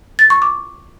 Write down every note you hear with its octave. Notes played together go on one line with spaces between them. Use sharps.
A6
C#6
D6